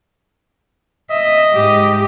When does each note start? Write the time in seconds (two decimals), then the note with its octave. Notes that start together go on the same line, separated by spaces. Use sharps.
1.11 D#5 E5
1.54 G#2 G4